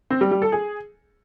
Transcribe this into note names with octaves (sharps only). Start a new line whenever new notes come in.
C4
G3
G3
A4
G#4